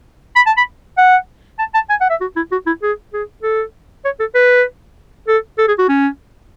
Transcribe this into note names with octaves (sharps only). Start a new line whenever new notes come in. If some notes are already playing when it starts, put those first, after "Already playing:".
B5
A5
B5
F#5
A5
A5
G#5
F#5
E5
F#4
E4
F#4
E4
G#4
G#4
A4
C#5
A4
B4
A4
A4
G#4
F#4
C#4